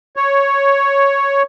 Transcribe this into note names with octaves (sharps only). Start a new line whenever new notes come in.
C#5